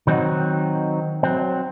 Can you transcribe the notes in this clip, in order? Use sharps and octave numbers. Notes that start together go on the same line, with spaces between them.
D#3 F#3 C4 C#4 D#4 F#4
F#3 C4